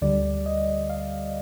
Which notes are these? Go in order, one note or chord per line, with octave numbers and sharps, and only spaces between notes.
D2 D3 G3 D5
D#5
F5